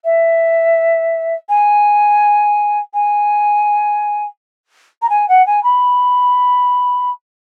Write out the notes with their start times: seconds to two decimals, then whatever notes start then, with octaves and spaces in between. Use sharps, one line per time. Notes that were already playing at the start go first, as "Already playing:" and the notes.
0.05 E5
1.49 G#5
2.94 G#5
5.02 A#5
5.10 G#5
5.29 F#5
5.47 G#5
5.64 B5